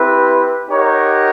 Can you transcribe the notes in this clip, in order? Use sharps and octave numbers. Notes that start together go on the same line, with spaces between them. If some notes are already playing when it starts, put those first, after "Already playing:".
Already playing: C4 E4 G4 B4
D#4 G4 A#4 C#5 F#5